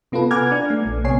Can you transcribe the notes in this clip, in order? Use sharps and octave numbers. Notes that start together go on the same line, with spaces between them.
C3 B3 F4 A4 B4
F#5 G#5 A#5 D6 F6 G#6
D4
A3
A#1
C2 C3 B3 C#5 G#5 C7